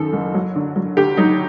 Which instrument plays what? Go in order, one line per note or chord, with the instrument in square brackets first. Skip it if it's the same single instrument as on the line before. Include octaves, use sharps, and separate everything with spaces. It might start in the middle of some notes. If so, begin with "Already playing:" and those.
Already playing: [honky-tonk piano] F#2 D#3 A4
F#1
F#3
D3
F#3
D2 G4
F#3 D#4